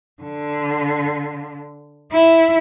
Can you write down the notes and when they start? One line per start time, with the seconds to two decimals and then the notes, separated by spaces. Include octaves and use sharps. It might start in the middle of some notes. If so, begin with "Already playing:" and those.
0.22 D3
2.12 E4